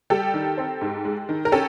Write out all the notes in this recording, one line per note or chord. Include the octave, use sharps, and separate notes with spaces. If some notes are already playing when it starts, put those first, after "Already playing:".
G3 G4 A4
D#3
C4
G#2
G#3
D#3
A#4
C#4 G4 A4